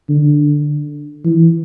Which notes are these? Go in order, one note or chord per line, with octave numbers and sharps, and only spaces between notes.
D3
E3